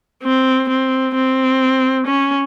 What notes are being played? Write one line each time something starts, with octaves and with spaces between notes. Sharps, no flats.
C4
C4
C4
C#4